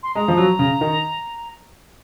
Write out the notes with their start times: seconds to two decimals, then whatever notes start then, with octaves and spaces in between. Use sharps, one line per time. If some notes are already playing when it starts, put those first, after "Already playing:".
0.03 C6
0.15 G#3 A#5
0.28 F3
0.37 F#3
0.59 C#3
0.81 D#3